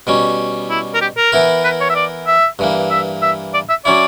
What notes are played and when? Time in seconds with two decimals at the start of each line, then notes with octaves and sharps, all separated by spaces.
0.07 B2 G3 C#4
0.70 E4
0.95 A#4
1.01 G4
1.17 A#4
1.32 E3 B3 E4 A#4
1.64 B4
1.81 C#5
1.90 E5
1.96 D5
2.27 E5
2.59 G2 E3 A#3
2.91 E5
3.22 E5
3.54 D5
3.70 E5
3.85 F#3 C#4 E4 D5